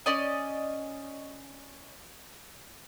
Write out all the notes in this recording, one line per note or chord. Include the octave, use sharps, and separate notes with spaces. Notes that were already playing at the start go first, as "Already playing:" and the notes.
C#4 D5 D#5